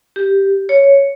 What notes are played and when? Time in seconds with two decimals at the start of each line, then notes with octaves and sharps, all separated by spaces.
0.16 G4
0.69 C#5